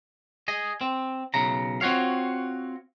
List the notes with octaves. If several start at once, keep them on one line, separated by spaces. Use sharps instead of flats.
G#4 D#5
C4
B1 C#3 A#5
C4 F4 F#4 C#5 F5